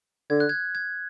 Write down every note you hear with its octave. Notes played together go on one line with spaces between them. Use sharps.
D3 G#6
F#6
G#6
G#6